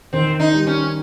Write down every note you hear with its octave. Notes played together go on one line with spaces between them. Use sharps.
D#3 C4
D#4
G3
C#4